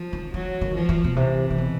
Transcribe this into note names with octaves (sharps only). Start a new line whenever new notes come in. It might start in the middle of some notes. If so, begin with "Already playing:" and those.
Already playing: F3
D#3
E3 F#3
D#3
F3
E3
B2
C3 E3
C3
B2